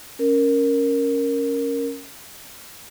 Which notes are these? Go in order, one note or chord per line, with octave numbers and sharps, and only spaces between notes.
C#4 A#4